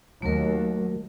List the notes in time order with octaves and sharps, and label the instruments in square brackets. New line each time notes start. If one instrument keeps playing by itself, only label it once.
[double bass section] D#2 [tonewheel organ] F#3 [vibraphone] A3 A#4